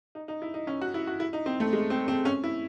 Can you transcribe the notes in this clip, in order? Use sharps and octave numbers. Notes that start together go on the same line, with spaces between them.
D#4
D#4
E4
D#4
C#4
F#4
E4
F#4
E4
D#4
C4
A3
G#3
C4
C4
C#4
E4